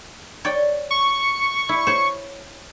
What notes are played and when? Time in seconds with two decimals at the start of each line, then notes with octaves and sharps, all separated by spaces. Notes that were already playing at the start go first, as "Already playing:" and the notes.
0.45 C#5 D5 G5
0.91 C#6
1.69 E4
1.87 C5 C#5